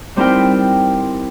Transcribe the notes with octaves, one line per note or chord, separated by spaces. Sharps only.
G3 C4 D#4 E4 A#4 G5